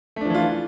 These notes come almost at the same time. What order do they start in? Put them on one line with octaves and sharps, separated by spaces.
A3 D4 F3 E3 F4